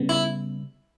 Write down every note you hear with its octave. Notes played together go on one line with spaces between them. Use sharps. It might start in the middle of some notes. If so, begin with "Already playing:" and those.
Already playing: C#3 G3 B3
E4